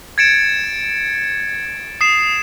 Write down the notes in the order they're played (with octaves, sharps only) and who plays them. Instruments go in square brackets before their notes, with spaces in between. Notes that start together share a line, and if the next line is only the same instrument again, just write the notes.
[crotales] G#6 A6 C#7 D7 E7
D#6 C7 E7